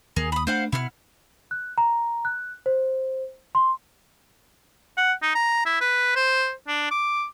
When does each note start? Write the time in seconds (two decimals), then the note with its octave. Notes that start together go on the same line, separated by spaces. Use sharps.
0.16 D#2 G#4 A#4
0.32 B5 D#6
0.47 A3 D4 C5 F5 F#5
0.72 B2 E4 F#5 F6
1.51 F#6
1.78 A#5
2.25 F#6
2.66 C5
3.55 C6
4.97 F#5
5.22 D#4
5.35 A#5
5.66 E4
5.81 B4
6.16 C5
6.67 D4
6.91 D6